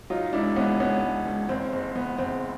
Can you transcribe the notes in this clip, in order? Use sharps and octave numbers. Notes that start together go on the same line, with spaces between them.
F#3 D#4 F4
C#2 D4 E4
C#2 B3 C#4
C#2 B3 C#4
C#2
C#2
F#1 C4
F#1 C4
F#1 B3
F#1 C4